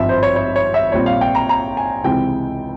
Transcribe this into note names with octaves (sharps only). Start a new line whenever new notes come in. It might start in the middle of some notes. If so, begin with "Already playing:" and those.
Already playing: G#1 G2 F3 C4 E5
C5
C#5
C#5
C#5
E5
A#1 A#2 G3 C4 C#5
F5
G5
A#5
A#5
G#5
C#2 C3 E3 G#3 C4 G5